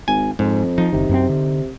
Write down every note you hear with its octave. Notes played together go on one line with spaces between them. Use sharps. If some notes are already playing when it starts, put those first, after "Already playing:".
G#1 G#5
F2 G#2
F3 D#4
F#1 C3 D#3
F#2 B3 C4
D3